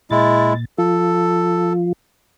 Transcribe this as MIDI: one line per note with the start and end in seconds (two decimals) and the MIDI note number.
0.11 0.65 46
0.11 0.53 56
0.11 0.53 64
0.11 0.65 93
0.78 1.93 53
0.78 1.93 65
0.78 1.73 69